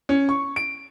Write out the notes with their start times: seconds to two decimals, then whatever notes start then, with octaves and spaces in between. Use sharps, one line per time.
0.09 C#4
0.29 C#6
0.56 D7